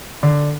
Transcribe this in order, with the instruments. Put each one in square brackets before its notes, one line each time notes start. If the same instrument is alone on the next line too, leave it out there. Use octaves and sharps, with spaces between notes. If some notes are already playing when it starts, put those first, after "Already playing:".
[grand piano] D3